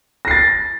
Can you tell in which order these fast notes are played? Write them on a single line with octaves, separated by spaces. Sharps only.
A#6 C7 A6